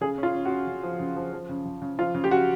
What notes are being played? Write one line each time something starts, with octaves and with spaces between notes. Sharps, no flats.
C#3 G#4
C#4
F4
C#4
F#4
C#4
C#3
F3
C#3
F3
F3
C#3
C#3
C#3
F3 F4
C#3
G4
C#3 F#4